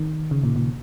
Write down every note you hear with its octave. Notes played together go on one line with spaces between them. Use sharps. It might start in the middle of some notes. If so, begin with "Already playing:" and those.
Already playing: D#3
C#3
A#2
A#2